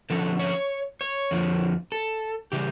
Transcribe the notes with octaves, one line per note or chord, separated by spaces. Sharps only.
D3 F3 A#3 C#4 A4
C#5
C#5
F2 D3 F3
A4
C#3 E3 G3 G4